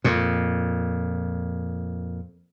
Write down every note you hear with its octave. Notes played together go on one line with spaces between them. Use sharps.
F2 A#2